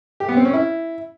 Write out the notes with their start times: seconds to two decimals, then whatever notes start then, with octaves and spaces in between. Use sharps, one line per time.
0.20 G4
0.29 B3
0.37 C4
0.45 C#4
0.53 E4